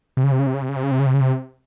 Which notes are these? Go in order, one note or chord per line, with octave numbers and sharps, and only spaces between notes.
C3
C#3
C3
C#3
C3
C#3
C3
C#3
C3
C#3
C3
C#3
C3
C#3
C3